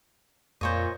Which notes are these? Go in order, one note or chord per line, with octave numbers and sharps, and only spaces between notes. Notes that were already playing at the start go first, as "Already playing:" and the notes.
F2 A#2 C5 C#5 D#5